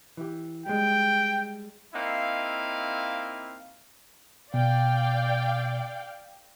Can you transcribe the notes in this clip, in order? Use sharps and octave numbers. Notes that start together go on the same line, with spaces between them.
E3 G4
G3 G#3 G5
A#3 C4 D#4 E4 F5
B2 D5 F5 G5